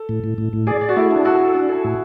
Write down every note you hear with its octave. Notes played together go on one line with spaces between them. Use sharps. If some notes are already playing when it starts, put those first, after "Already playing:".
Already playing: A4
A2
A2
A2
A2
G#4 D5
D5
F#4
A3 E4
D4
F#4 A4
A4
D4
A4
A2